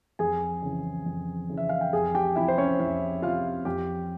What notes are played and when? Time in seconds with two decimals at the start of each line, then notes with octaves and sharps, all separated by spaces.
0.19 F2 G#4 G#5
0.62 C#3 E3
1.06 F2
1.50 C#3 E3
1.58 E5
1.69 F5
1.81 G5
1.93 F2 G#4 G#5
2.15 G4 G5
2.36 C3 F3 E4 E5
2.48 C5
2.58 C#4 C#5
2.79 F2 E4 E5
3.22 C3 F3 F4 F5
3.65 F2 G4 G5